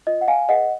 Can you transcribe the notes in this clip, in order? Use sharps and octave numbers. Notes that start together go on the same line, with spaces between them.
F4 D#5
F#5
F5 G#5
G#4 B4 D#5 F#5